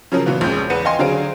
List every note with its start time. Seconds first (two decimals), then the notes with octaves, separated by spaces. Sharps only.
0.12 C#3 F3 F#3 C#4 A#4
0.26 A#2 E3 F#3 B3 F4 F#4
0.41 A#1 F2 G#3 C#4 G6
0.70 E2 B4 F#5 C#7 D#7
0.85 D#5 F5 G5 G#5 C6
0.99 D3 F#3 G#4 C5 F5 D7